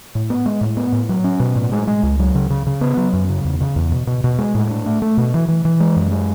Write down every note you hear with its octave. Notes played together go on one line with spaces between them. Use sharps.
A2
B3
G#3
A2
B3
A2
F#3
C#4
B2
A2
G#3
G#3
C#2
F#3
C#3
C#3
C#3
B3
F#3
F#2
C#3
E2
C#3
E2
B2
B2
B2
G#3
A2
D4
A3
A3
B2
E3
E3
E3
G#3
F#2
G#3